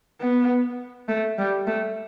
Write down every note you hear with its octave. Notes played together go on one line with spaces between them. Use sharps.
B3
A3
G3
A3